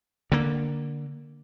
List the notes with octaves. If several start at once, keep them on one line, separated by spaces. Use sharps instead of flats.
D3 A#3